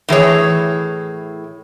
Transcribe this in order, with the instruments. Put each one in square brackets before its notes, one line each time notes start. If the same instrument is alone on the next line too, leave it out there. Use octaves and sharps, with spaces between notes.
[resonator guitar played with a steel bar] A2 E3 G#4 C#5